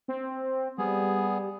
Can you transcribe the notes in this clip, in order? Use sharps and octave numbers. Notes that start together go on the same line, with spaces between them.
C4
G3 B3 G#4